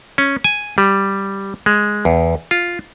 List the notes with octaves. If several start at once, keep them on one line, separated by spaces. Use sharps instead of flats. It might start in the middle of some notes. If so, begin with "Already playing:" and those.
C#4
G#5
G3
G#3
E2
F4